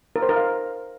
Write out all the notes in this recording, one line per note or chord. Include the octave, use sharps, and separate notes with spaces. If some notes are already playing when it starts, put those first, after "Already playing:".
A#4
C5
A#4
F5